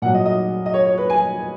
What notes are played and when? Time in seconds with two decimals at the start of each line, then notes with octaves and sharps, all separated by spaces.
0.02 A#2 F#3 F#5
0.14 D#5
0.26 D#5
0.66 D#5
0.74 C#5
0.86 C#5
0.98 B4
1.10 G#5